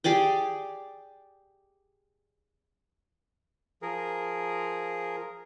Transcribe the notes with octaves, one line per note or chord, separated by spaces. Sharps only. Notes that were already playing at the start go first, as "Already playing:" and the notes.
G4 G#4 D5 G5
F3 G#4 A#4